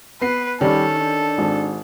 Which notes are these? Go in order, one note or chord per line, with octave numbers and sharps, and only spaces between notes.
B3 B4 C7
D#3 G3 C#4 G4 A4 D5
D4
G#1